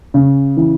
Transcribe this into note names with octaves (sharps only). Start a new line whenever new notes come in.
C#3
E3